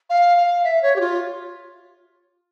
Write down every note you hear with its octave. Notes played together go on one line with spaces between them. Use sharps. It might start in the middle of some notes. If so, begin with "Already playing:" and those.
F5
F5
E5
C#5
G4
F4